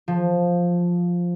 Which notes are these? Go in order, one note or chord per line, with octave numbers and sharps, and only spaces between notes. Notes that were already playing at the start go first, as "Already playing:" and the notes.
F3